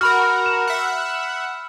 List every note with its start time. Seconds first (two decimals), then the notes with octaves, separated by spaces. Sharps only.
0.01 F#4 A#4 B5 F6
0.46 E7
0.67 E5 F#5